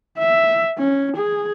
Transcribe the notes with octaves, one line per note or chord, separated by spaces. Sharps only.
E5
C#4
G#4